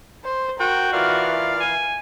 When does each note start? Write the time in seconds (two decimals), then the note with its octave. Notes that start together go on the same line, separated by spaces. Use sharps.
0.25 C5
0.60 F#4 A#4 G5
0.93 E3 F4 A#4 D5 F5
1.60 G#5